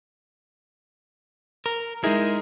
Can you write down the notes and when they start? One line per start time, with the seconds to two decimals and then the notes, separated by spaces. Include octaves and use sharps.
1.66 A#4
2.04 G#3 D#4 E4 G#4 A#4